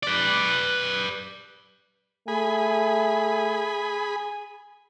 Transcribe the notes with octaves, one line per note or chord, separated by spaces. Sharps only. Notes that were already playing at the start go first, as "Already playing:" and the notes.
B4 D5
A3 G#4 G#5 B5